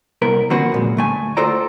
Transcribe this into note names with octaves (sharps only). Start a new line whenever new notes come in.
C2 B3 A#4
D3 F3 A#3 C4 F#4 B4
F#2 A#2 G#3
D2 A3 G#5
F4 F#4 A4 C5 D5 A#5